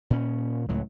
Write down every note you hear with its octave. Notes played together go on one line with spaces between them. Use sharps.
A#2 C#4
C#2 A2 F#3